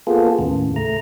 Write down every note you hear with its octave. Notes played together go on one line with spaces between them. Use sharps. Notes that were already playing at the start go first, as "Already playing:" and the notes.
A#3 B3 F4 G#4 A4
D#2 A2 C#3
A3 A#5